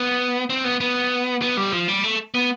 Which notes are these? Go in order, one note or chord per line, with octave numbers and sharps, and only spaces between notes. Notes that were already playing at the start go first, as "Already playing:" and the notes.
Already playing: B3
C4
B3
B3
B3
G3
F3
G3
A3
B3